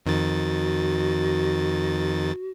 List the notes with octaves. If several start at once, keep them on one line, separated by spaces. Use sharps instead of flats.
F2 D#3 F#4 A6